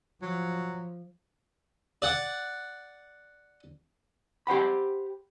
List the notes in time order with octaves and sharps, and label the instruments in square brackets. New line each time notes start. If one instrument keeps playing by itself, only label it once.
[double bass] F3 [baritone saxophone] F#3
[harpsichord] D5 F#5
[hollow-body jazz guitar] G4 C5 F#5 B5